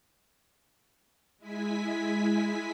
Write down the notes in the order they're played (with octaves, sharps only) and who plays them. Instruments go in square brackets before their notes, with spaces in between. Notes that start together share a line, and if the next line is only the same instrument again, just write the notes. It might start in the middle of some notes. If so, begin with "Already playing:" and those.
[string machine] G#3 E4 G#5 B6